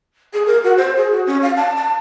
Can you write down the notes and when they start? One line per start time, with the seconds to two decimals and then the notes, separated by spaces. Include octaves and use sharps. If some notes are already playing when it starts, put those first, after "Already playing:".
0.34 G#4
0.47 A#4
0.64 F#4
0.77 C5
0.97 G#4
1.12 F#4
1.27 C#4
1.42 F5
1.57 A5
1.77 A5